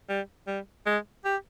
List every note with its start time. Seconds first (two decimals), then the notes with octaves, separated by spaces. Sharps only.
0.09 G3
0.47 G3
0.86 G#3
1.25 G4